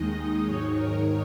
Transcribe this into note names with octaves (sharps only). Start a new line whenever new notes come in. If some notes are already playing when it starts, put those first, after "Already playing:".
Already playing: D#2 D#3 G#3 D#4 D#5
D#5
G#2 D#3 F#3 D#4 C#5
A#4